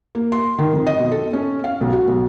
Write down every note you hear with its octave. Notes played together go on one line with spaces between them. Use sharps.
A#3
C6
D#3
F2
D#5
B2
A4
C#4
F5
B1
F#4
B1